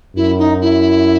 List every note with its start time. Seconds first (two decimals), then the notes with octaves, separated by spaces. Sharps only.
0.16 F#2 E4
0.38 D#4
0.61 E4